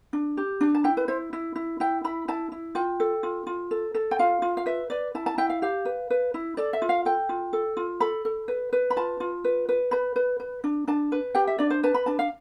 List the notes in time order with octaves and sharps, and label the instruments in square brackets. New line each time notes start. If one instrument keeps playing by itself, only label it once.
[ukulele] D4
G4
D4
A5
E4 G5
B4
E4 C5
E4
E4
E4 G5
E4 B5
E4 A5
E4
F4 G5
A4
F4
F4
A4
A4
G5
F4 F5
F4
F5
B4 E5
B4 D5
E4 A5
A5
E4 G5
F5
G4 F5
B4
B4
E4
A4 D5
E5
F4
F5
A4 G5
F4
A4
F4
A4 B5
A4
B4
B4
B5
F4 A5
F4
B4
B4
B4 B5
B4
B4
D4
D4 A5
B4
G4 G5
E5
D4 D5
C5
B4 A5
B5
D4 A5
F5